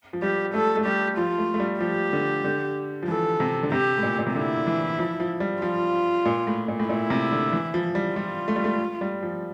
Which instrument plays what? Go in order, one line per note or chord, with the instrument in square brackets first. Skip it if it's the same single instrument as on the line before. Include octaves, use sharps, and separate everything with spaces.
[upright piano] F3
[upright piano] G3 [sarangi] G4
[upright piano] A3 [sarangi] A4
[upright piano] A3
[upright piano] G3 [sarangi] G4
[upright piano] F3 [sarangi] F4
[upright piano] A3
A3
G3
[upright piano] F3 [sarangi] G4
[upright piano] D3
D3
F3
[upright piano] E3 [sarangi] A4
[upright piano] C3
D3
[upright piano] C3 [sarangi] G4
[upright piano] A2
A#2
A#2
C3
[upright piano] D3 [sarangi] E4
[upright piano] E3
F3
F3
G3
[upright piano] F3 [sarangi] F4
[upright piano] A#2
A2
A#2
A2
[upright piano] A#2 [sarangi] E4
[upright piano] C3
D3
E3
F3
G3
[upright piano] G3 [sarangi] F4
[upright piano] A3
G3
A3
G3
F3